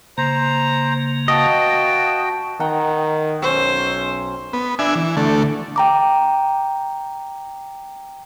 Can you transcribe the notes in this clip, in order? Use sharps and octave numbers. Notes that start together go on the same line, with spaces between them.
C#3 A#3 C5 A#5
F#4 B4 D#5 F5 G5 A5
D#3 F#5 G5 A#5
B1 C#4 C5 C#6 E6
B3
D4 E5 G#5
E3
D3 A3
G5 A#5 D6